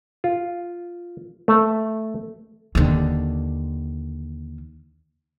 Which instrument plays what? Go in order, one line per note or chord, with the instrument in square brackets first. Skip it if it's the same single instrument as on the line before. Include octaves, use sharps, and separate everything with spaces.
[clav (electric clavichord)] F4
A3
[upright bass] D#2 D3